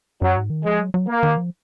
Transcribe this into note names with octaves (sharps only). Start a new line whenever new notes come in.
F#2 F#3
G#2
D#3
F3 G#3
F#3
F#3
A#3
D#3
F3